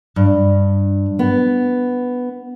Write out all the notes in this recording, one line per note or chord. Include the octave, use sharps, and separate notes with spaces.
G2
B3